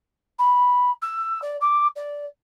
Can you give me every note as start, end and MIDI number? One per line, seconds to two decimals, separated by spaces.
0.39 0.91 83
1.02 1.39 88
1.42 1.57 74
1.61 1.87 86
1.96 2.25 74